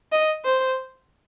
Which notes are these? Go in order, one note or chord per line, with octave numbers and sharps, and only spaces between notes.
D#5
C5